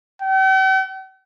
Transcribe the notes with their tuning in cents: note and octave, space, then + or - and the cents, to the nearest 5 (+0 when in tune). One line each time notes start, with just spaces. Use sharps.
G5 -45